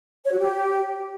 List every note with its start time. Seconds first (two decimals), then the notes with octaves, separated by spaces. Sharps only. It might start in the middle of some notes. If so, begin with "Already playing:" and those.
0.24 C#5
0.31 F#4
0.38 G4